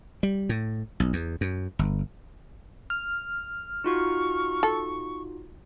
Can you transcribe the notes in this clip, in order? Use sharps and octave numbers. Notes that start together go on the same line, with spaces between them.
G3
A2
B1
E2
F#2
G1
F6
D#4 F4 F#4 C#6
A4